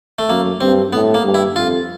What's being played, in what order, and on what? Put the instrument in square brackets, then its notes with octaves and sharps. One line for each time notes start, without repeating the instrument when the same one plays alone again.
[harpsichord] A3
[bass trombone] F#2 [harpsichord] A#3
[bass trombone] G2 [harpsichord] C4
[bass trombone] A2 [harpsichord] B3
[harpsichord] A#3
[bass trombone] G2
[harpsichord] E4
[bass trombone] F2 [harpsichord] F4